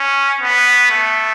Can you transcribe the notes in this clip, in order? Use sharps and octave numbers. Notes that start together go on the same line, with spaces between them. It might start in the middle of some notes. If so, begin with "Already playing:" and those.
Already playing: C#4
B3
A3